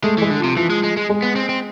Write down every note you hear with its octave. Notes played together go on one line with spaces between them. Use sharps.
G#3 A3
E3 G#3
D3
C3 F3
E3 F3
G#3
G#3
G#3
G#3
B3
C4
C4